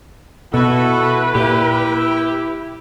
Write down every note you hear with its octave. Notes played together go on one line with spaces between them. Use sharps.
B2 E4 F#4 A4 B4
A#2 E4 G4